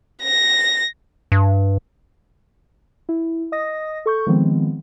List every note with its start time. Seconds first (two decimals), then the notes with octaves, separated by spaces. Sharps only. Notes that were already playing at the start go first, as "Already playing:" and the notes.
0.23 A#6
1.32 G2
3.09 E4
3.52 D#5 D#6 A#6
4.06 A4 C#6 G6
4.27 D#3 F3 G#3 B3 C4